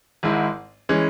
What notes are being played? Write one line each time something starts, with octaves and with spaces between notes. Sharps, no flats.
G#1 G#2 G#3 E4
E3 G#3 C#4